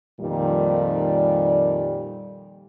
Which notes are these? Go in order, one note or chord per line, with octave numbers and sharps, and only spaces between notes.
F2 A#2 D#3 G3